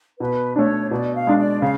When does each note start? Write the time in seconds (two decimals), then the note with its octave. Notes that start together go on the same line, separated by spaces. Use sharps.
0.20 B2 B4
0.56 A3 D4 C#5
0.91 B2 D5
1.14 F5
1.27 G#3 D4
1.38 D5
1.62 C#3 F5